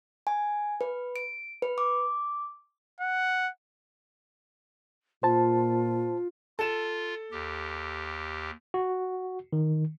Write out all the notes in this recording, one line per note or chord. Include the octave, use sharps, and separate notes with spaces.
G#5
B4
D7
B4
D6
F#5
A#2 F4 C5 A5
F4 A4 E7
D#2 G4
F#4
D#3